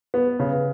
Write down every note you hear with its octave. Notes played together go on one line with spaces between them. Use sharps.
B3
C#3